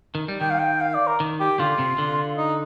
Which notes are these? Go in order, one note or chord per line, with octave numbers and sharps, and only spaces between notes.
D#3
G3
D#3 G5
F5
G5
F5
D5
A#4
D#3
G4
D3 F4
C3
D3
D#4